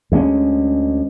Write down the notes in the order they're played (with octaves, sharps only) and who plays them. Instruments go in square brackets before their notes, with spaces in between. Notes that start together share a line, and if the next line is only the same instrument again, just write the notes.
[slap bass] D2 G#3 C4 C#4